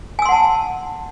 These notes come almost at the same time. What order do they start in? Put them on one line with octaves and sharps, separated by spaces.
G#5 E6 C6 F#5 A5